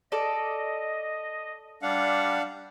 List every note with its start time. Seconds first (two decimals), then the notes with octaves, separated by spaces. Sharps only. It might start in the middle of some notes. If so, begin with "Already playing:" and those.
0.12 A4 D5 D#5
1.82 G3 D4 F5 F#5